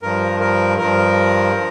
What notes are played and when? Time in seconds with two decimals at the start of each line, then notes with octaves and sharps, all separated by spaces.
0.02 G2 F3 A#4
0.40 A#4
0.78 G2 F3 A#4
1.54 F3